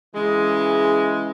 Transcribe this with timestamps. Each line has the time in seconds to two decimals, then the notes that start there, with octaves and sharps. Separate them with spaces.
0.15 C#3 E3 G#3